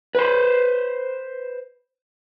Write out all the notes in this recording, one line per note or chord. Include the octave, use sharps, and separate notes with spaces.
B4 C5